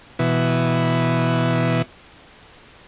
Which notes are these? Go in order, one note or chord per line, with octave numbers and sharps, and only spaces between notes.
B2 E3